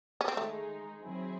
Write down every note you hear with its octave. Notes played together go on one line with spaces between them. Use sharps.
C#4
C4
D#3 G#3 A3 D#4 G#4
D#3 F#3 C4 E4 G#4